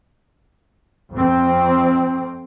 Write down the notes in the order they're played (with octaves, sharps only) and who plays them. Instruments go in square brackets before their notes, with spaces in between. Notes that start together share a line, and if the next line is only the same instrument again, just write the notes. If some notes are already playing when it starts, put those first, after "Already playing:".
[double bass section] F2 C4